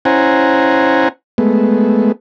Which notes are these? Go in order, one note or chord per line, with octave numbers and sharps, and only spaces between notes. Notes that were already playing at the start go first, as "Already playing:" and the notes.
C#4 E4 C5 F#5 G#5 A#5
G#3 A3 B3